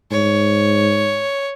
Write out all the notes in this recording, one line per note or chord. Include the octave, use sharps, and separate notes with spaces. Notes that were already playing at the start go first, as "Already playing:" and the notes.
G#2 C#5